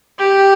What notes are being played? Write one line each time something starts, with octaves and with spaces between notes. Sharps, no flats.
G4